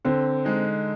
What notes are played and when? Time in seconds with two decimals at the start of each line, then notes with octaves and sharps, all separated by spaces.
0.05 D3 C4
0.45 G#3 D#4